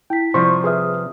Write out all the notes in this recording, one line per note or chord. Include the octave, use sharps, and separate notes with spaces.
E4 G5 B6
C3 F3 G3 C5 C6 C#6
G#4 B4 E5 D#6 F6